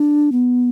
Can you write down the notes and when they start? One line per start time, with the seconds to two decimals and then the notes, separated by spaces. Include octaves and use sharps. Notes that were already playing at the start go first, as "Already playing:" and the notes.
Already playing: D4
0.32 B3